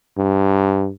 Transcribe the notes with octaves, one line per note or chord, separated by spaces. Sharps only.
G2